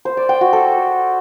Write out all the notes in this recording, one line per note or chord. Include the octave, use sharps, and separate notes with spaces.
C5
D5
G5
F#4
A4